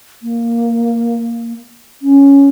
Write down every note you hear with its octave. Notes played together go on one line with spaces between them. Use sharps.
A#3
C#4